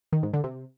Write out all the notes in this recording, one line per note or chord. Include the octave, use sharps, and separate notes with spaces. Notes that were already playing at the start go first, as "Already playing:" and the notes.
D#3
G#2
D3
C3